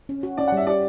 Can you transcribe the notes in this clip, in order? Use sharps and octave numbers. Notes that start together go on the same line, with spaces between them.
C#4
F#4
C#4 D5
F#5
G3 E5
G4 D5